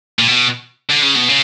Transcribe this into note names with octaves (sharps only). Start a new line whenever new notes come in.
A#2
B2
D3
C#3
B2
C#3